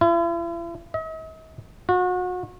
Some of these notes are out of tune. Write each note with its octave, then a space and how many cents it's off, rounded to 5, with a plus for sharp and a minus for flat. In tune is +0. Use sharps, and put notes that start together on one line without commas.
E4 +45
D#5 +45
F#4 -35